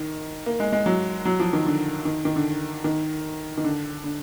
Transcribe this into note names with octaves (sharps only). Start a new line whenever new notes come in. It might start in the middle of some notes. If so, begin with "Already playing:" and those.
Already playing: D#3
A#3
G#3
G#3
F#3
F#3
F3
D#3
D3
D#3
D#3
D3
D#3
D#3
D3
D3